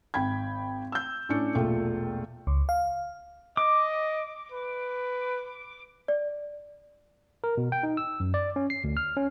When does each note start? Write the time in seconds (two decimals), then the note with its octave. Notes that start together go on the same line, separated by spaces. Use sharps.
0.14 G#1 G5 B5 G#6
0.92 E6 G6
1.29 A2 C#4 D4 C#7
1.55 E1 A#1 A3 F4 G5
2.47 C#2
2.69 F5
3.57 D#5 D6
4.52 B4
6.08 D5
7.44 A#4
7.57 B2
7.72 G5
7.83 D#4
7.97 E6
8.20 F#2
8.34 D5
8.56 C#4
8.70 C7
8.84 D2
8.97 F6
9.17 C#4